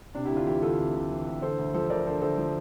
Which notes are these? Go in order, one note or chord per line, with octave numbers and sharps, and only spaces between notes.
C3 D4
E4 G4
D2
D4 F4
E3 E4 G4
D2 F4 A4
C3
D2
E3
D2
D3 A4 C5
D2
F3 A4 C5
D2 A#4 D5
A#4
D3 A4 C5
D2 A4 C5
F3